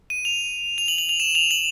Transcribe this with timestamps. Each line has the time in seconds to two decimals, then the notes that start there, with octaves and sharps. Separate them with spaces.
0.10 D#7
0.25 F7
0.78 F7
0.88 F#7
0.98 F#7
1.09 F7
1.20 E7
1.35 F7
1.51 F#7